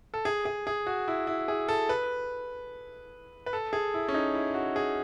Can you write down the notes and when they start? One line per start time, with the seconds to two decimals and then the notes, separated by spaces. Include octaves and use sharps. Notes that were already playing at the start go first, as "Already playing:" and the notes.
0.14 A4
0.25 G#4
0.45 G#4
0.67 G#4
0.86 F#4
1.08 E4
1.27 E4
1.48 G#4
1.69 A4
1.89 B4
3.46 B4
3.53 A4
3.73 G#4
3.94 E4
4.08 C#4
4.14 D#4
4.35 E4
4.54 F#4
4.76 G#4